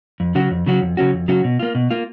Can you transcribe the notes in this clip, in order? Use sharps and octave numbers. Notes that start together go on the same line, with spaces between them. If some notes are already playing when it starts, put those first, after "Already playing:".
F2
C#3 F#3 C#4 F#4
F2
C#3 F#3 C#4 F#4
F2
C#3 F#3 C#4 F#4
F2
C#3 F#3 C#4 F#4
B2
A#3 F4
B2
A#3 F4